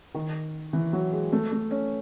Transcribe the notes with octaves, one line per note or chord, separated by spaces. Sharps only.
D#3
E3
F#3
G#3
A3
A3
C#4